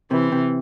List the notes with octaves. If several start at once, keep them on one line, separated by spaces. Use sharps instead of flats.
C3 E3
C3